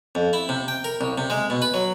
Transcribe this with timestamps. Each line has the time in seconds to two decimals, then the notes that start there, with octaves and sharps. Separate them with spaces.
0.15 F2
0.33 E4
0.49 C3
0.68 G5
0.84 A#4
1.01 C2
1.18 C3
1.30 G#3
1.50 B2
1.62 B4
1.74 F#3